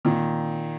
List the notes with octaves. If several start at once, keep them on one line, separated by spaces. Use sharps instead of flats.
A#2 D#3